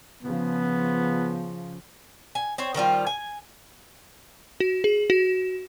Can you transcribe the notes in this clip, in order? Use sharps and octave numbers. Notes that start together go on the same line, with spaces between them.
C#3 F3 B3
G#5
C4 C5 C#5
D#3 F3 G3 F4
G#5
F#4
G#4
F#4